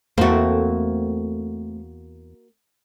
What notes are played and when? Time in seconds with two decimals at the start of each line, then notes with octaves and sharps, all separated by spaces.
0.18 E2 A3 A#3 C4 F#4